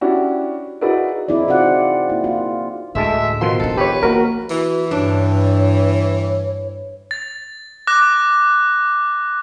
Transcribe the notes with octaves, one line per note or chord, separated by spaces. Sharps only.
C#4 D4 E4 F#4 G4
D#4 E4 F#4 G#4 B4 D5
C4 D#4 E4 G#4 D5
C4 F4 F#4 D5 F#5
A#3 E4
F4
D2 A2 G#3 A4 E5
B2 D#3 F3 C6
A3 D4 A4
G4 B4 C#5
A#3 F#4 A#4
E3 F#4
G2 D4 C#5
A6
D6 F#6 A#6